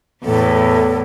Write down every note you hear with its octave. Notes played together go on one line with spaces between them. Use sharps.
E2 A2 A4